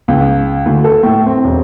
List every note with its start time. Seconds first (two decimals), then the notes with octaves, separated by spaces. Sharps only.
0.08 C#2
0.66 D2
0.84 A4
1.03 A2
1.26 C4
1.44 E1